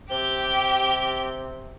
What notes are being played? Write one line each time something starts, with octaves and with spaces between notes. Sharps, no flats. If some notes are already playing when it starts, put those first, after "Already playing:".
C3 G4 G7